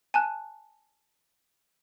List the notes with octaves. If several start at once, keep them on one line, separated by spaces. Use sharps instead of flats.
G#5 A5 F#6